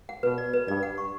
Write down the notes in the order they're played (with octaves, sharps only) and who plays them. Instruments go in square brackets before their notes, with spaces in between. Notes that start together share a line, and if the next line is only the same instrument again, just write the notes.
[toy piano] F#5
[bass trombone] B2 [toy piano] B4
[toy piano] D5
B4
[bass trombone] G2 [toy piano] D5
[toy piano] F#5
C#6